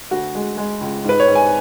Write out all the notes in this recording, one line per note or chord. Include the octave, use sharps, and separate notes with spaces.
D2 F#4
G#3
G#3
C#2
G#2 B4
C#5
G#2
G#5